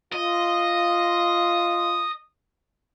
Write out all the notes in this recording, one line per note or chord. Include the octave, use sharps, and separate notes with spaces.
F4 D#5